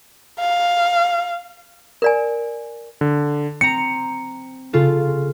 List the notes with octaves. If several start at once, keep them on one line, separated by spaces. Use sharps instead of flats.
F5
A#4 D5 G#5
D3
C4 A#5 C#7
C#3 F4 A4